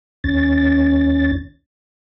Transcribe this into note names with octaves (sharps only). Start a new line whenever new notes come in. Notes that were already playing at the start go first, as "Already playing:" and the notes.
D#2 C#4 A6